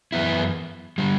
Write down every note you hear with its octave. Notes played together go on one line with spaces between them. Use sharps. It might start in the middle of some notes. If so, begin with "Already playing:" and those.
F#2 E3 B3 E4
D3 G3